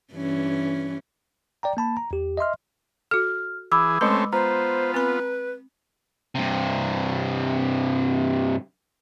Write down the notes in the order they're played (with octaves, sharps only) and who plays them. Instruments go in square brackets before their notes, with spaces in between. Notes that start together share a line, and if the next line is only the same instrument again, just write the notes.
[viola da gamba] G2 E3 C#4
[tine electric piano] D5 G5 A#5
A#3 A5 B5
A#5
E2 G4
D#5 E5 C6 F6
[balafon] F#4 A4 [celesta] F6
[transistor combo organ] E3 G#4 [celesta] B5 D6 E6
[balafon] G#3 B4 [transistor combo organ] A3 C4 C#4 [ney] C6
[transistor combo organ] B3 F4 [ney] C5 [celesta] A#5
[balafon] C4 B5 [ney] B4
[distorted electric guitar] G2 C3